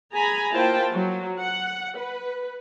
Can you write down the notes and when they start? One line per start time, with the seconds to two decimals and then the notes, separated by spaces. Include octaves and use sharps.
0.13 G#4 G#5 A#5 B5
0.53 A#3 E4 F4 C5 G5 A5
0.92 F#3
1.39 F#5
1.98 B4